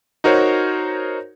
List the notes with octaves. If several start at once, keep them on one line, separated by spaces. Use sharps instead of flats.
D#4 F#4 A#4 C5 C#5